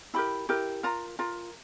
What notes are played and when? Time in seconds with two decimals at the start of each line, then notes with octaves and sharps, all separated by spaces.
0.14 E4 G4 A#4 B5
0.49 E4 G4 A#4
0.83 F4 A#4 A#5
1.19 F4 A#4 A#5